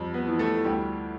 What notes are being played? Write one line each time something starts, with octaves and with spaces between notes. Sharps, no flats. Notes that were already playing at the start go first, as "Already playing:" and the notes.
Already playing: F2 G3
B3 B4
E3
A3 A4
D2 G3 G4